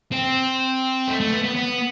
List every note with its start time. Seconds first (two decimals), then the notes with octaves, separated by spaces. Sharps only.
0.12 C4
1.08 A3
1.20 A3
1.32 B3
1.44 B3
1.56 B3